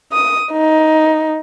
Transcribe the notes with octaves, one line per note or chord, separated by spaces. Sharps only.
D#6
D#4